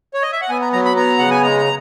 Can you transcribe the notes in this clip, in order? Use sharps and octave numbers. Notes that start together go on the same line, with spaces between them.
C#5
D#5
E5
F#5
B3 G#5
A#5
F#3 A#5
B5
B3 A#5
C#3 F#5
G#5
G#3 A#5